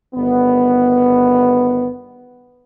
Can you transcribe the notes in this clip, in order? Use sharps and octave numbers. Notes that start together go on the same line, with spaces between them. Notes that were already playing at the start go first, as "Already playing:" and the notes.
G1 D#3 B3